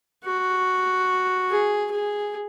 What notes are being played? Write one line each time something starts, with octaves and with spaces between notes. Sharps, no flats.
F#4
G#4
G#4